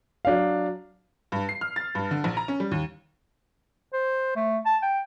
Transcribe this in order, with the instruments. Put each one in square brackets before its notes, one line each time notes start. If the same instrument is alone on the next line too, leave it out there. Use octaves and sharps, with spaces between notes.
[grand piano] F#3 D4 F5
[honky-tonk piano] G2
C7
F6
A6
G2
D3
A#1
A#5
C#4
G3
D#2
[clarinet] C5
A3
A5
G5